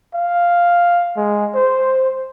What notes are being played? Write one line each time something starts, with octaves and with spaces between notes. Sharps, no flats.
F5
G#3
C5